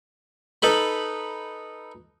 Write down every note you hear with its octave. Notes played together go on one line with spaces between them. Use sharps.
D#4 A4 B4 B5